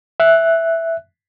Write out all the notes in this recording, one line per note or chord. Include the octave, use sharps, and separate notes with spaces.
E5 F#6